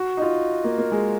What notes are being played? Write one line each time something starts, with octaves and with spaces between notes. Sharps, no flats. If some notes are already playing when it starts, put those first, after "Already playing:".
Already playing: F#4
D#4
F4
A#3
A#3
G#3